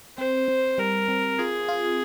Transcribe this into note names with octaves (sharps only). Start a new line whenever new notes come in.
C4 C5
C4
G3 A#4
C4
F4 G#4
F4